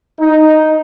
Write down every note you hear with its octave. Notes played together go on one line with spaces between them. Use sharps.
D#4